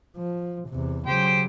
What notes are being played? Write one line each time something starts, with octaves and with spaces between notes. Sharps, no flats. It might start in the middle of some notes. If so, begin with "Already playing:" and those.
F3
E2 C3
C#3 F#3 G4 C5 G5